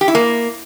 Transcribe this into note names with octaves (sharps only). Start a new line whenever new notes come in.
G4
E4
A#3